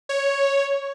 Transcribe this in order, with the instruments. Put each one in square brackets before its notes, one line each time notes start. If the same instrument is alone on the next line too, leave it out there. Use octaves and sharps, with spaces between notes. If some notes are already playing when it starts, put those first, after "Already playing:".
[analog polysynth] C#5